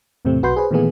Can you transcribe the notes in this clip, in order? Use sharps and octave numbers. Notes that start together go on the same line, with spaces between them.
E2 A2 C3 A3 C4
B1 F#4 B4 C6 G6
G#4 B4 C5
A#2 D#3 E3 A3 B3 G#4